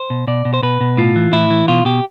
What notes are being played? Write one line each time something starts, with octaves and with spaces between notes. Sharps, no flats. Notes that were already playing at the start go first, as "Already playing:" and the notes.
Already playing: C5
B2
B2 D5
B2
C5
B2 B4
B2
A2 F4
E3
A2 E4
E3
B2 F4
B2 G4